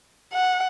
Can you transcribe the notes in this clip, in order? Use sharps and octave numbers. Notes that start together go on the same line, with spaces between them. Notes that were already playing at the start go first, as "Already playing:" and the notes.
F#5